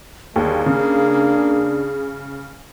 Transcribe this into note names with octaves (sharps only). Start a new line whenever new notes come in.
G1 D#2 A#3 G#4 D5 G5
C#3 D4